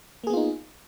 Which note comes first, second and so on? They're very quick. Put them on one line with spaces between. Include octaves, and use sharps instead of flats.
A#3 G#4 B3 F4 D#4